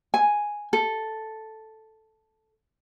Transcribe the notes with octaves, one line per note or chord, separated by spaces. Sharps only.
G#5
A4